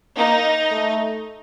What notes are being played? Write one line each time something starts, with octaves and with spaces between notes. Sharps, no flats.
A#3 D#4
A3